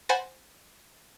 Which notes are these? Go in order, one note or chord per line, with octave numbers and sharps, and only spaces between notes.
C5 F#5 G#5 B5 A6 A#6